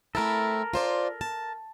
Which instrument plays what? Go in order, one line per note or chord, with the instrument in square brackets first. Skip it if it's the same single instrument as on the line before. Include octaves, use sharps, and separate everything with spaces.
[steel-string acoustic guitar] A3 C4 E4 [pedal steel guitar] A4 A#4
[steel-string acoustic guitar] F4 C5 D5
A5